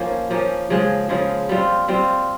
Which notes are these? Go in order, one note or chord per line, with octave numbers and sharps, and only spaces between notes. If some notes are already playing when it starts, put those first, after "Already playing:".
Already playing: F3 A#3 C#4 D#4
F3 A#3 C#4
C#3 F3 G#3
C#3 F3 G#3
G3 C4 F4
G3 C4 F4